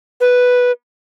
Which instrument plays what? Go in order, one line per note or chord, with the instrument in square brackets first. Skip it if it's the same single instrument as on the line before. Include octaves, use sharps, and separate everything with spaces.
[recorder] B4